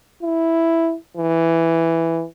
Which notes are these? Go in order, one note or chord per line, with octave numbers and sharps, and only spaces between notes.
E4
E3